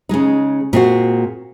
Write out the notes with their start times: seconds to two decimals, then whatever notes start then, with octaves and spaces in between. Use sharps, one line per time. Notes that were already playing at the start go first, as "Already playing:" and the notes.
0.09 C#3 G#3 D#4
0.73 A#2 G#3 C4 F#4